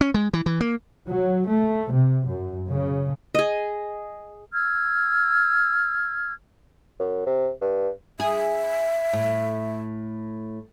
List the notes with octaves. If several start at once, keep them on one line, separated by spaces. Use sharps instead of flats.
C#4
G#3
E3
E3
A#3
F#3
A3
C3
F#2
C#3
G#4 D#5
E6 F6 G#6
F#2
C3
G2
G#4 E5
A2